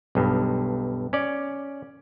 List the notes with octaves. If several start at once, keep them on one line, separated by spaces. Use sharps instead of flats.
B1 G2
C#4 D5